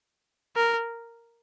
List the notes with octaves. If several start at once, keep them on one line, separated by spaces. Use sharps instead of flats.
A#4